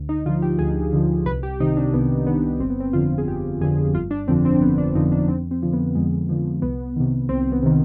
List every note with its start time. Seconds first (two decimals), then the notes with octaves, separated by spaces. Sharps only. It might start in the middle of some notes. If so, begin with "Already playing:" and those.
Already playing: D2
0.09 D#4
0.26 D3 F4
0.29 F3
0.42 G4
0.59 D2 G#4
0.93 D3 F3
1.26 C2 B4
1.43 G4
1.60 C3 D#3 D#4
1.77 D4
1.94 C2 B3
2.27 C3 D#3 B3
2.60 G1 C4
2.70 B3
2.80 C4
2.93 F2 D3 F3 F4
3.18 G#4
3.27 G1 G4
3.61 F2 D3 F3 G#4
3.94 G1 F4
4.11 D4
4.28 F2 D3 F3 C4
4.45 C4
4.61 G1 B3
4.78 D4
4.95 F2 D3 F3 D#4
5.12 D4
5.28 F2 C4
5.51 C4
5.62 D3 F3
5.73 B3
5.95 F2 G#3
6.29 D3 F3
6.62 C2 B3
6.96 C3 D#3
7.29 C2 C4
7.52 B3
7.63 C3 D#3